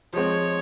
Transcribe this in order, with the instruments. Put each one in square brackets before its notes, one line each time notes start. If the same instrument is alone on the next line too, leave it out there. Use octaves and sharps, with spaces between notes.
[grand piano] F3 G#3 C4 [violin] C#5